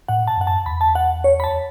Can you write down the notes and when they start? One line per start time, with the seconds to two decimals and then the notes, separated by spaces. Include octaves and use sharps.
0.08 A2 F#5
0.27 A5
0.37 F#2 F#5
0.47 A5
0.66 E2 B5
0.81 A5
0.95 F#5
1.24 C#5
1.40 B5
1.44 A5